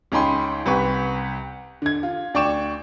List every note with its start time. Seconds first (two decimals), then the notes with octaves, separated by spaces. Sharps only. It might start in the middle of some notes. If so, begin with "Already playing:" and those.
0.12 C#2 C#4 D#4 G5 B5 C6
0.66 C2 B4 G5 C#6
1.82 D3 G#6
2.03 F4
2.34 D2 D5 G5 C#6 E7